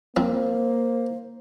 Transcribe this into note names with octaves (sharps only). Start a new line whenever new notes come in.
F3 A#3 C4 C5